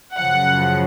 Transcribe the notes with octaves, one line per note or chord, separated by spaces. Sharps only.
F#2 C#3 F3 F#5